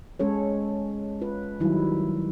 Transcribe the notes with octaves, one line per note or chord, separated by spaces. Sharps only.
G#3 C#4 A4 C#5
F4 B4
D#3 F#3 G3 D#4 E4